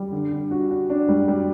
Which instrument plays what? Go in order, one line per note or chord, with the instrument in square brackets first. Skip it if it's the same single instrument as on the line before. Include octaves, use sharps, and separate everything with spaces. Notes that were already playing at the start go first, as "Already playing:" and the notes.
Already playing: [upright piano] G3
D3
D3
F#4
F#4
D4
G3
G3